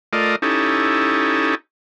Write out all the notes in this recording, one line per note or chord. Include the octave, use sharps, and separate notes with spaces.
A3 F4 A#4 D5 D#5
C#4 D#4 E4 G4 A4